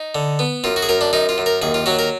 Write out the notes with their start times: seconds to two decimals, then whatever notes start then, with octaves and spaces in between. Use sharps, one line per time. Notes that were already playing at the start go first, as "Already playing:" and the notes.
Already playing: D#4
0.15 D3
0.39 B3
0.64 F#2 F4
0.76 F#4
0.83 G#4
0.89 F#2 A#4
1.01 D4
1.13 F#2 D#4
1.29 F4
1.38 F#2
1.46 A#4
1.62 D#2 G#4
1.74 F4
1.86 F#3 F#4
1.99 A#4